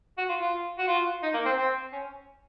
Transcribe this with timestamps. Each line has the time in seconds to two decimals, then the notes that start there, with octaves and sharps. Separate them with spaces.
0.18 F#4
0.29 F4
0.41 F4
0.79 F#4
0.88 F4
1.23 D#4
1.34 A#3
1.45 C4
1.57 C4
1.92 C#4